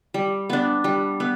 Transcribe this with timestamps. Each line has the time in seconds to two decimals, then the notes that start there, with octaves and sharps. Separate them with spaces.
0.14 G3
0.50 B3 D4
0.84 G3
1.20 B3